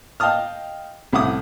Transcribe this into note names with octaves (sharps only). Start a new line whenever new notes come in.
D#5 F5 G5 A5 D#6 F6
C2 A2 F#5 D6 D#6